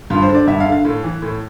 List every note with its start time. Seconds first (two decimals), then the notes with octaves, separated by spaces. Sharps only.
0.10 G2 F4
0.22 C5
0.29 D3
0.35 D5
0.47 G2 E5
0.60 F5
0.66 D3
0.72 F5
0.85 A2
1.04 E3
1.22 A2